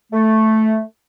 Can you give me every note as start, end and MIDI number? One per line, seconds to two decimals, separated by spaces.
0.12 0.80 57